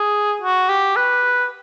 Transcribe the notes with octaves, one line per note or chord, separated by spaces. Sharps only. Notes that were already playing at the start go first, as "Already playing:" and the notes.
Already playing: G#4
F#4
G4
B4